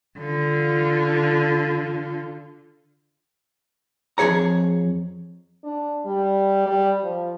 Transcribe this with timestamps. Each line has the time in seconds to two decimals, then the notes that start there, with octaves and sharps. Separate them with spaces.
0.19 D3 F4
4.18 F2 B2 G#4 C#5 A#5
5.64 D4
6.06 G3
6.66 G3
7.03 F3